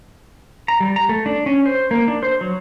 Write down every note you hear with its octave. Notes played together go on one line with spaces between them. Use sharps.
A#5
G3
A#5
A3
D4
C#4
C5
A#3
D4
C5
F#3